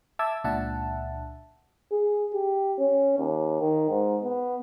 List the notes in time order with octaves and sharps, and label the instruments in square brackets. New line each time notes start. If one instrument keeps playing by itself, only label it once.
[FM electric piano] E5 A5 D6 E6 G#6
C#2 A#2 D4 E5 F#5 A5
[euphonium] G#4
G4
C#4
D#2
D#3
G#2
B3